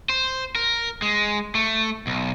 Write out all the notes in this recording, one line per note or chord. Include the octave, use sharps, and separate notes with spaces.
C5
A#4
G#3
A3
B1